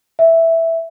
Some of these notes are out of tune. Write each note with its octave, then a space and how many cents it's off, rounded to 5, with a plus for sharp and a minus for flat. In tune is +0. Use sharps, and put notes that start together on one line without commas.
E5 +0